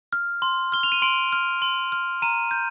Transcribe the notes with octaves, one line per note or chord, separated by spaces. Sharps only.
F6
C6
F6 G7
F7
D#7
C6 D7
F6
C6
F6
A#5 D#7
G6